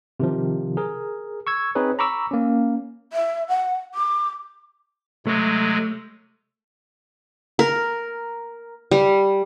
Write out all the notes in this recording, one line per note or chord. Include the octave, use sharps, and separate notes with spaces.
C3 D#3 F3
G#4 A#4
C#6 E6 G#6
C4 D#4 G#4 B4 C#5
A#5 B5 C#6 D6 E6
A#3 C#4
E5
F#5
D6
C3 F#3 G#3 A3
A#4
G3